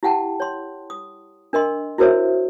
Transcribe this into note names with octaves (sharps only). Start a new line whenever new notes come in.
E4 G4 F#5 G5 A5
C#5 C6
D#6
D4 A#4 D#5 C6
E4 F#4 A#4 C5 C#5 E5